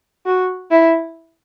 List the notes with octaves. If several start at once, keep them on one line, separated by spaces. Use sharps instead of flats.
F#4
E4